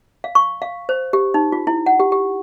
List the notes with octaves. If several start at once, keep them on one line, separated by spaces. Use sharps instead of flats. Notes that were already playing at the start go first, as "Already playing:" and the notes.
F5
C#6
F5
C5
G4
D#4
F4
E4
F#5
G4
G4